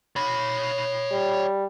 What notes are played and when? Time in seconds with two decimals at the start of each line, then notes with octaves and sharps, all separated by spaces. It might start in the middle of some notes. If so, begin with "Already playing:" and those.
0.16 C#5 B5
1.11 G3